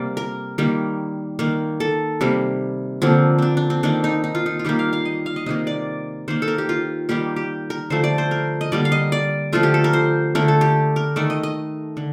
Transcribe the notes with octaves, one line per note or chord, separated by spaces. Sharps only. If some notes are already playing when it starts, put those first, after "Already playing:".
Already playing: C3 G3 A#3 D5
A#4
D#3 G3 A#3
D#3 A#3
A4
C3 G3 A#3
D3 F3 A#3 C4
C4 D4
D4
C4
D#3 A#3 D4
D#4
D#4
F4
D#4
F4
D#3 G3 A#3 G4
F5
F5
D#5
F5
D#5
C3 D#3 A#3 D#5
D5
D#3 A#3 C5
A4
A#4
G4
F4
D#3 G3 A#3 G4
G4
A#4
D3 F3 A3 C5
D5
C5
A#4
D#5
D3 G3 A#3 D5
F5
D#5
D5
D3 F3 A3 F4
G4
A4
A#4
C5
D3 A3 A#4
A4
G4
A#4
D#3 A3 D5
D#5
D#5
D3